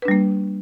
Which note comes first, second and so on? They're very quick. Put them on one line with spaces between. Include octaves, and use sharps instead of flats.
B4 D4 G3 A#3